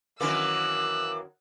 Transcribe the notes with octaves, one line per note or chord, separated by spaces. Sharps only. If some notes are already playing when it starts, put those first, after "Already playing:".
F#2 D#3 E3 F#3 A#3 D6 E6 F#6